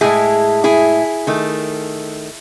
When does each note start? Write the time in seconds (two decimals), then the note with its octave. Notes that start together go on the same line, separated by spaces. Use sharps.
0.01 A2 G#3 E4 G#4
0.64 E4 G#4
1.27 D#3 A3